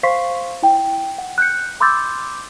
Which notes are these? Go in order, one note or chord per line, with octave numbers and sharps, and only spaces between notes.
C5 F5 C6 C#6 B6 C7
E4 G5
F#5
F#6 G6 C#7
B5 C6 D6 E6 G6 A6